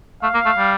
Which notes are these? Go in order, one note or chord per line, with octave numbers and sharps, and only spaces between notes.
A3 F5
A#3
A3
G3